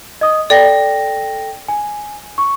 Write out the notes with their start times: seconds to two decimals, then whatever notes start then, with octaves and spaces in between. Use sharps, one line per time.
0.21 D#5 D#6
0.50 A4 D5 G5 A#6
1.68 G#5
2.38 C#6